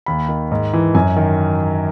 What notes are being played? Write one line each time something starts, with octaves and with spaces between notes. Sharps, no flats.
D#2 B5
D#3
G#2
E3
F#2 G#5
D#3